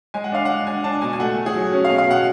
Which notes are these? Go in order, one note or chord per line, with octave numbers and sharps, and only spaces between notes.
G#3 G#5
F#5
D4 F5
G#3 F#5
D4 G#5
D4 A5
B2 G#5
G#5
A3 F#5
A3
G#4
F#3
C#4
B2 F5
F5
B2 F#5